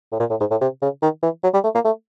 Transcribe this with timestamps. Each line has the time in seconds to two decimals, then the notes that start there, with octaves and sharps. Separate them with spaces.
0.12 A2
0.20 A#2
0.30 A2
0.40 G#2
0.51 A2
0.61 C3
0.82 C#3
1.02 D#3
1.23 E3
1.44 F#3
1.54 G3
1.64 A3
1.75 A#3
1.85 A3